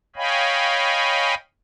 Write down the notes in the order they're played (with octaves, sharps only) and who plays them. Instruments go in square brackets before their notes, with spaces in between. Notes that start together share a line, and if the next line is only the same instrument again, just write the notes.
[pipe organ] C#5 D#5 F5 G5 G#5 B5